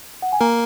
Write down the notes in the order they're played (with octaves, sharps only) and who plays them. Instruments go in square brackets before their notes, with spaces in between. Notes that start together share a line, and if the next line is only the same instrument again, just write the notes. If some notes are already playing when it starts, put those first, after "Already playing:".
[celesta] F#5
G#5
[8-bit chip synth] A#3 A#4 [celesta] A#5